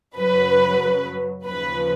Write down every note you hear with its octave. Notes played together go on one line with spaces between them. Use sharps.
F#2 C#3 F#3 B4
D#2 C#3 F3 B4